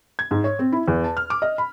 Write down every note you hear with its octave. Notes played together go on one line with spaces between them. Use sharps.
G#6
G#2
C#5
C4
E4
E2
A5
F6
D6
D#5
B5